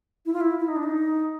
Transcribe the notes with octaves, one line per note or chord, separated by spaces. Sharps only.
E4
F4
E4
E4
D#4
D4
D#4